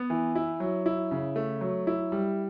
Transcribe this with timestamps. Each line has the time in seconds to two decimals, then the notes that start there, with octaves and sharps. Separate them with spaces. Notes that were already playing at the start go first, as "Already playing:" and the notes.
Already playing: B3
0.10 E3
0.35 E4
0.60 F#3
0.86 E4
1.11 C#3
1.36 A3
1.61 F#3
1.87 E4
2.12 G3